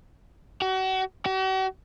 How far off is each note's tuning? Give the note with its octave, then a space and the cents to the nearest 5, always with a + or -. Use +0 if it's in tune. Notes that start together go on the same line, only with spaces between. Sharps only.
F#4 +35
F#4 +45